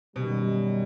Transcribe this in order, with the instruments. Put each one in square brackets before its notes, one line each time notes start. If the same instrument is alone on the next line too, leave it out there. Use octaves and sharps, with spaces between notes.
[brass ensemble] F#2 D#3 G3 [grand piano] B2